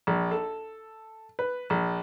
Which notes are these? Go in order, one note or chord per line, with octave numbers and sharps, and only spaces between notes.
A#1
A4
B4
A#1